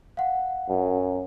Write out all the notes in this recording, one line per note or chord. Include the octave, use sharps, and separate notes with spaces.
F5 F#5
F#2